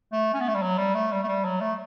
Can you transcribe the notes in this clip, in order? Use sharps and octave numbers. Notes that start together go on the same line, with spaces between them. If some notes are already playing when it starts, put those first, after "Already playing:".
A3
C#4
B3
A3
G3
F#3
G3
A3
G3
A3
G3
F#3
A3